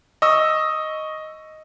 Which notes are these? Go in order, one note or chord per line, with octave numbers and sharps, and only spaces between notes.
D#5 C#6 E6